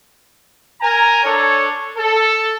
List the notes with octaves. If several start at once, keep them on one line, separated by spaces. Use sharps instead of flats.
A#4 G#5 A#5
D4 A4 C#5
A4